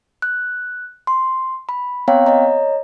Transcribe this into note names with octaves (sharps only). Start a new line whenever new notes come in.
F#6
C6
B5
B3 C4 C#5 F5 G5 A#5
C#5 D#5 A#5